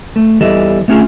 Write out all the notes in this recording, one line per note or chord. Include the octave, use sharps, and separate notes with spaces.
A3
E2 E3 G3 A4 D#5
A3 B3 C#4 F4 G#4